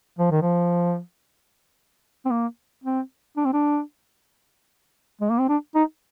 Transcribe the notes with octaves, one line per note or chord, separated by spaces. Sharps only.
F3
D#3
F3
C4
A#3
C4
D4
C4
D4
G#3
A#3
C4
D4
D#4